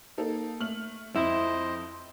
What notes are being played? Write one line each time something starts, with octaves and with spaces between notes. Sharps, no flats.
A#3 D#4 A4
A3 F6 F#7
F2 E4 C5 D#5